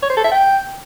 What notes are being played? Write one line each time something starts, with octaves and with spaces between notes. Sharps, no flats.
C#5
C5
A4
E5
G5